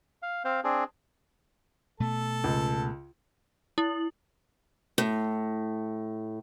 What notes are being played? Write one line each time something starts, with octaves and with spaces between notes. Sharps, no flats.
F5
C4 C5 F5
C4 D4 G#4
B2 A3 A4
C#2
E4
A2